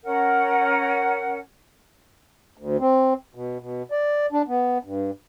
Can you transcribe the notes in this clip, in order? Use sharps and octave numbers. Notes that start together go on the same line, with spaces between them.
C#4 A#4 F#5
D2
C4
B2
B2
D5
D4
B3
G2